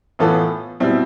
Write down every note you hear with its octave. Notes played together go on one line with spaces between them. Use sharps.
A2 E3 B3 F4 A4
B2 G3 C4 E4